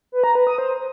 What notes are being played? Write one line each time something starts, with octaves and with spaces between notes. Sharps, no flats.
B4
A#5
B4
D#6
C5